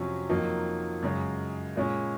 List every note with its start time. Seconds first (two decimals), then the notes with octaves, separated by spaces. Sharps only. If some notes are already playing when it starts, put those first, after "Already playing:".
Already playing: F2 C3 F#3 C#4
0.29 F2 D#3 F#3 A#3 D#4
1.02 F#2 C#3 G#3
1.76 A#2 G#3 C#4